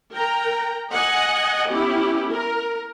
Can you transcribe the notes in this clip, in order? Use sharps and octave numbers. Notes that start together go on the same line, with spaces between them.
A#4 G5 A#5
D#5 F#5 G#5
B3 C#4 E4 G4
A#4